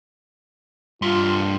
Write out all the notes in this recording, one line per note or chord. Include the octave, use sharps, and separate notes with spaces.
G2 F4 C6